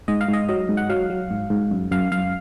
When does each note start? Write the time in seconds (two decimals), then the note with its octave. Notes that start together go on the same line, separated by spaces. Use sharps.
0.08 G#2 D#5
0.21 F5
0.28 G#2 D#5
0.49 F#3 D#5
0.69 G#2
0.77 F#5
0.90 F#3 F5
1.10 F#3
1.30 G#2
1.50 G#2
1.71 F#2
1.91 F#2 F5
2.12 F#2 F5